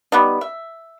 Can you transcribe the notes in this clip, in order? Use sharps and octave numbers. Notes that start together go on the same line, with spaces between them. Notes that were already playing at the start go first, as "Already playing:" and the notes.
G3 B3 D#4
E5